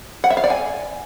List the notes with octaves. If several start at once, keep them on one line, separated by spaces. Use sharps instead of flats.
F#5
E5
F5
D5
G#5